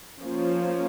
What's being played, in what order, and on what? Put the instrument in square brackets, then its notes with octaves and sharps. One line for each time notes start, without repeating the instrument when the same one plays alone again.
[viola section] F3 A#3 C#4